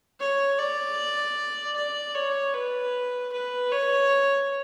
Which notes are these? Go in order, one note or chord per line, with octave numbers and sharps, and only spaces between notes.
C#5
D5
D5
C#5
B4
B4
C#5